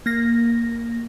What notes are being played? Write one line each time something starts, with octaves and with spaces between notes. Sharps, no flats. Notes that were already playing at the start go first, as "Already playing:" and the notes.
A#3 A#6